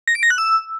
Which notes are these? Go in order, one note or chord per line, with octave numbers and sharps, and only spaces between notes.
A#6
D7
A#6
F#6
E6